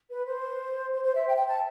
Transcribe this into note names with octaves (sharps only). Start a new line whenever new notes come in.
B4
C5
C5
C5
E5
G5
G5
A5